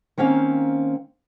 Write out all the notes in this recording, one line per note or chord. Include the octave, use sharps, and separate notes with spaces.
D#3 A#3 C4 C#4 F5